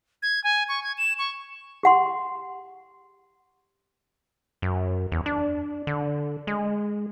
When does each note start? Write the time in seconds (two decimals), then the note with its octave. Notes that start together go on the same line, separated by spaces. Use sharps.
0.22 G#6
0.44 G#5
0.68 C#6
0.83 G#6
0.98 E7
1.18 C#6
1.83 G4 F#5 C6
4.62 F#2
5.12 E2
5.26 D4
5.87 D3
6.47 G#3